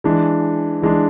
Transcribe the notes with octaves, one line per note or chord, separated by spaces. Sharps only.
E3 G#3 D4
E3 G#3 D4